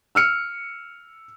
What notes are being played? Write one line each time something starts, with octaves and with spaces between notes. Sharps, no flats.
E6 F6 C#7